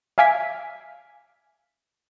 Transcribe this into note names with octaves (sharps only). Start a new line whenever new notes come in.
E5 F5 G#5 D6 G#6 B6